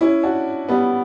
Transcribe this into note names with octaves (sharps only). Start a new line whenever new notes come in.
C#4 E4
D4 F#4
G3 B3